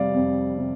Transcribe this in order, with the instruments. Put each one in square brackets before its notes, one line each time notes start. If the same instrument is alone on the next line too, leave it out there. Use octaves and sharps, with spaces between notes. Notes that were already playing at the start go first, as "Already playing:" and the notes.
Already playing: [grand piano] F2 C3 G3 D5 F5
F2
C3